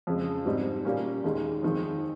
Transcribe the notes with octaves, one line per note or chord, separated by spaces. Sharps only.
F2 C#3 G#3
G#2 G3 C4 D#4
A#2 G3 A#3 C#4
D#2 D#3 G#3 D#4
F2 D#3 G#3